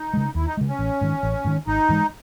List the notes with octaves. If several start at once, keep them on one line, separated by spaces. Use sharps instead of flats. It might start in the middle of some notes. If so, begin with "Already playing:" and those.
Already playing: D#4
C#3 G#3
D#2 E4
D#4
C#3 G#3
C#4
A1
G#2 D#3
A1
G#2 D#3
G#1 D#4
G#2 E3 G#3